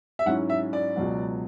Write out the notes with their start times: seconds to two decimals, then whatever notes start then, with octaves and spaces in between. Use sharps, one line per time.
0.19 E5
0.26 G#2 F#3 C#4 E4 F#5
0.50 E5
0.73 D5
0.96 C#2 B2 F#3 B3